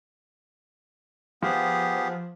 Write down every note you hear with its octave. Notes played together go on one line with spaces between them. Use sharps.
F3 B3 G4 G#4